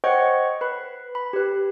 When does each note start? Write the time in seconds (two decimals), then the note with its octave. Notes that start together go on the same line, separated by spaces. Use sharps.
0.04 C5 C#5 D#5 F#5 G5 C#6
0.61 B4 B5
1.15 B5
1.33 G4 B4